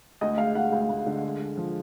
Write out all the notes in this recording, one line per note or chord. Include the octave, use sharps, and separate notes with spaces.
D2 D#5
G#3 F5
D2 F#5
D2
D2
D3
G#3
G#3
F3